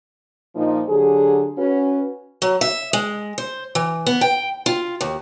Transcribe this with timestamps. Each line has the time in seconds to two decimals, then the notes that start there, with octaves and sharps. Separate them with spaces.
0.55 A#2 F3 D#4
0.89 D3 F#3 G4 G#4
1.58 C#4 F#4 B4
2.42 F#3
2.61 E5
2.93 G#3
3.38 C5
3.75 E3
4.06 B3
4.21 G5
4.66 F4
5.01 D#2